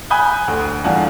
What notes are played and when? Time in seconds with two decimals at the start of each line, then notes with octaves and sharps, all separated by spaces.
0.10 G#5 B5 D#6 F#6 G6
0.48 D2
0.84 E2 G2 F4 F#5 G#5 A5